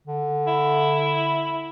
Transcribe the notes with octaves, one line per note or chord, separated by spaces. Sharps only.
D3
E4